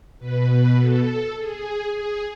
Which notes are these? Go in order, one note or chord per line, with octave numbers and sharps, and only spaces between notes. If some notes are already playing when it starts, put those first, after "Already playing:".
B2 B4
B4
A4
G#4
G#4